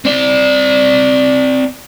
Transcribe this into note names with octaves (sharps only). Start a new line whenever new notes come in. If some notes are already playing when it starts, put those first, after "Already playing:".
C4 D5